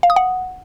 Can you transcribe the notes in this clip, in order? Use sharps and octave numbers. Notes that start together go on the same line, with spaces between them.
F5
D#6
F#5